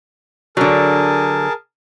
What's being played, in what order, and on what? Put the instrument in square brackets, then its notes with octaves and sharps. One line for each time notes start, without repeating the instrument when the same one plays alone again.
[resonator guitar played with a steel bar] D3 F#3 [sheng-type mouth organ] G#4 A#4 A5